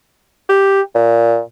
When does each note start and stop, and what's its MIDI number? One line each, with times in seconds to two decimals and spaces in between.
0.49 0.82 67
0.95 1.40 46